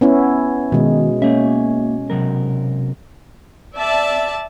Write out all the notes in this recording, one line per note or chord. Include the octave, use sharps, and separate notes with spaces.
B3 C#4 E4
B2 D#3 G#3
A#3 C#4 E5
C3 F#3 A#4
D5 E5 A5